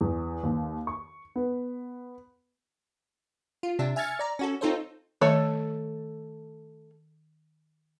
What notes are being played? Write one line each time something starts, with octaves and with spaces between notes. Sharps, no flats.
E2
D#2
C#6
B3
F4
C3 D4 E5
E5 G#5 F6 G#6 A6 C#7
D5 A#5
C#4 F#4 A4
C4 D#4 F4 A4 C5 C#5
D#3 A3 A4 C#5